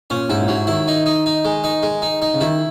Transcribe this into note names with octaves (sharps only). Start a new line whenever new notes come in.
A#2 C#4
G#2 E4
A#2
G#2 F#3
D#3 E4
D#4
D#4
D#4
G#3
D#4
G#3
D#4
D#4
C#3
D#3 E4